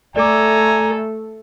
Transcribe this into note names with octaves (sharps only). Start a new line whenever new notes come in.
A3 A4 D5 G#5 A#5 D6